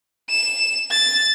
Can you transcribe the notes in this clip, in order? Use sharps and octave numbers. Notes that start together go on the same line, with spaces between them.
E7
A6